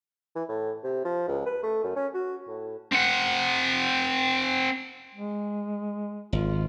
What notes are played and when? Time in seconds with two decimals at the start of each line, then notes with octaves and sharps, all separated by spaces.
0.35 E3
0.49 A2
0.84 C3
1.05 F3
1.28 C#2
1.46 B4
1.63 A3
1.84 F#2
1.96 C#4
2.14 F#4
2.47 A2
2.92 C4 F#5
5.14 G#3
6.33 G#1 F4